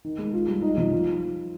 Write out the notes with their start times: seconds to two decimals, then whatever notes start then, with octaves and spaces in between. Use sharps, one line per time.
0.05 D#3
0.18 G#3
0.33 F4
0.48 G3
0.62 D#4
0.78 F3
0.93 F4